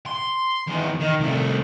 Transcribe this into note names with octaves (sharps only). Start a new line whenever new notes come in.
C6
E2 D#3
D#3
C2 A3